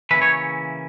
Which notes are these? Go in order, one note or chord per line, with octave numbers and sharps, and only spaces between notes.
C#3 E3 A#3 C#4 E4 B4
C#5